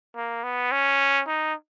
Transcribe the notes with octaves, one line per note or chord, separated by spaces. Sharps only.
A#3
B3
C#4
D#4